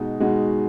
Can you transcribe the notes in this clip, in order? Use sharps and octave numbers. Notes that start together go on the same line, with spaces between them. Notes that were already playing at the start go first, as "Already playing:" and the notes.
Already playing: B2 G#3 D#4 F#4
B2 G#3 D#4 F#4